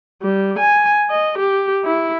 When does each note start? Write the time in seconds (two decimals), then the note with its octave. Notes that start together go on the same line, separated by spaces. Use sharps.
0.23 G3
0.59 G#5
1.10 D#5
1.39 G4
1.85 E4